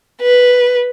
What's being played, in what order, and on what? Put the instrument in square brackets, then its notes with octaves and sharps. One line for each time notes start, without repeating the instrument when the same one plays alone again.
[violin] B4